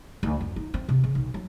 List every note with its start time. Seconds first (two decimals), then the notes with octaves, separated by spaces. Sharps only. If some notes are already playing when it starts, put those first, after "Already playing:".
0.23 D2
0.41 F#2
0.56 D#4
0.74 C4
0.89 C3
1.04 C#3
1.15 B1
1.34 F#3